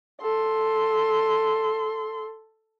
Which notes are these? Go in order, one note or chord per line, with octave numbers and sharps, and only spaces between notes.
A4 C6